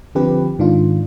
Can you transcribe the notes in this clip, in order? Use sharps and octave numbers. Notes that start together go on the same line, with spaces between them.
D3 F3 C4 G4 B4
G#2 D#3 D4 F4